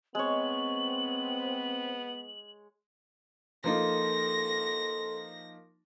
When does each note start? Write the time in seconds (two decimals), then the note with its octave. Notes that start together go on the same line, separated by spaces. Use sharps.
0.15 G#3 B3 C4 C#5 F#7
3.64 F3 A#3 D#4 A4 C6 A#6